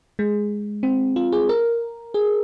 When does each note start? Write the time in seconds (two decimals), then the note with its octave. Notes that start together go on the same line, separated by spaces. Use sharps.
0.19 G#3
0.83 C4
1.16 F4
1.32 G#4
1.49 A#4
2.14 G#4